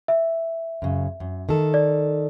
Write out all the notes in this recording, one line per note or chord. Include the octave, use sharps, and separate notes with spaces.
E5
F#2 C#3
F#2
D#3 A4
D5